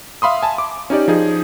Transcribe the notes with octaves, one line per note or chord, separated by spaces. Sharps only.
E5 F5 B5 C6 D#6
G#5 A5
D6
C#4 D#4 G4 D5
F3 D#4 G#4